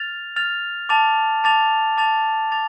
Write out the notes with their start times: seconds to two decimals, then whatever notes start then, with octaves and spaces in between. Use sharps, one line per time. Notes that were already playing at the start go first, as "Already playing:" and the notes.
Already playing: F6 A6 F7
0.36 F6 A6 F7
0.89 A5 D6 A6 F7
1.44 A5 D6 A6 F7
1.97 A5 D6 A6 F7
2.51 A5 D6 A6 F7